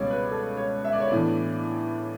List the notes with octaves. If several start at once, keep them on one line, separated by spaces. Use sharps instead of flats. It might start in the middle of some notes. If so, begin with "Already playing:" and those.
Already playing: C#2 B2 G3 C#4 C#5 D5
B4
A4
C#5
E5
D5
C#5
A2 E3 B3 D4 D5